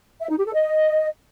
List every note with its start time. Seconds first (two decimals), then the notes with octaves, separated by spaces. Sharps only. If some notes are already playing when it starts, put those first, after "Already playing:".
0.21 E5
0.29 D#4
0.37 G4
0.45 A4
0.54 D#5